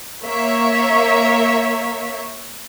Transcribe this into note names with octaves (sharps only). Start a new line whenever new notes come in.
A#3 C#5 E5